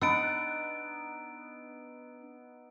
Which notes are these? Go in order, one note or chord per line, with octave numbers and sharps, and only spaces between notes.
B3 D4 D#4 F#5 E6 D7